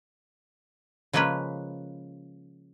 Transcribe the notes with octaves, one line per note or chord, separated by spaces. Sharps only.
C#3 F3 G#3 A#3 C#4 B4